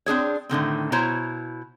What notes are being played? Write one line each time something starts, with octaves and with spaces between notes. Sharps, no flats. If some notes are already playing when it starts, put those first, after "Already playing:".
C4 D4 G#4 C#5
A2 D3 D#3 C4
B2 E4 C5 C#5 A#5